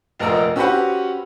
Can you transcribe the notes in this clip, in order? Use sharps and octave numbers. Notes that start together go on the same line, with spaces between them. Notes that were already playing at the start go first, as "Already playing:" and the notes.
F1 A#1 A#4 D#5 A#5 E6
C#4 F#4 G4 B4 C5 F#5